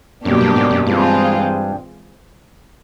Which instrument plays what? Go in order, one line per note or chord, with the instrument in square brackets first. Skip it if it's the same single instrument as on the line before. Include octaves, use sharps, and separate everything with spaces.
[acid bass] F#2 [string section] B2 F#3 A#3 D4 G4
[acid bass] G2
G#2
F#2
[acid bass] G2 [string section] E3 G#3 C4 F4 G#4